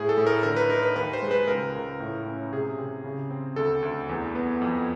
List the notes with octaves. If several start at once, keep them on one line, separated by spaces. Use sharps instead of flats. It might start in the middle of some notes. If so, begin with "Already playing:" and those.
Already playing: A2 G#4
A4
A2
A#4
D3 A#4
B4
D#4 A#4
B4
D#2 B4
C5
G#3
B4
C#2 A#4
C#2
A2
C#4
C3 G#4
C3
C#3
C4
D2 A4
D2
E2
B3
F2